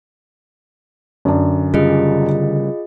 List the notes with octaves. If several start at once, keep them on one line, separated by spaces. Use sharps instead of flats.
F#2 D3 D4
C#3 G3 F4 G#4 D#5